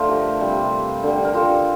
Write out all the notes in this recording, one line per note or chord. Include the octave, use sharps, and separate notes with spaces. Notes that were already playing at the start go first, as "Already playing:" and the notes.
Already playing: D3 F3 A3 F4
G4 A#4
C3 G3
D3 G3
A#4
F4 A4